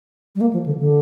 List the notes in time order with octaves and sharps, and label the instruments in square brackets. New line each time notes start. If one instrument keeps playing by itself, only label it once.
[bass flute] G3
A#3
F3
D3
D3